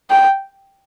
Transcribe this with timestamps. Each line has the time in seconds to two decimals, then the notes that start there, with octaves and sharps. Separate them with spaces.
0.10 G5